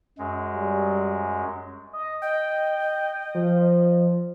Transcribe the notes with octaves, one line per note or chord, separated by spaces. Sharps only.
F#2 G#3
G3
D#5
D#5 G5
F3